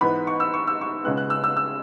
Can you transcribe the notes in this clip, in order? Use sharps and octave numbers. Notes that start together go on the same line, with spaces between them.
G#2 E3 B3 B5
C#6
E6
C#6
E6
C#6
C#2 C#3 G#3 B3 F#6
F#6
E6
E6
E6